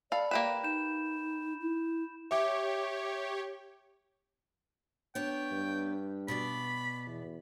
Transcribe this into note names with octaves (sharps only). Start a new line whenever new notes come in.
A4 D5 F5 B5
A#3 G4 B4 E7
D#4 G6 E7
E4
G4 C#5 E5 D6
B3 D4 C#5 G5
G2
B2 B3 D5 B5
E2